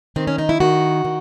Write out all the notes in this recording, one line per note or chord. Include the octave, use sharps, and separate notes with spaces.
D#3 C4
C#4
D#4
E4
D#3 F#4
D#3